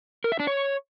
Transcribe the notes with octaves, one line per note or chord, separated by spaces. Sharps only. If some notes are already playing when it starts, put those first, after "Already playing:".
A#4
E5
D4
C#5